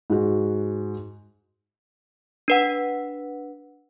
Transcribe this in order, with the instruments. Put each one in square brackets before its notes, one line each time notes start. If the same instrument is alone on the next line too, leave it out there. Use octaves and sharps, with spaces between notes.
[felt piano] G#2 F#4
[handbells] D4 B4 F#5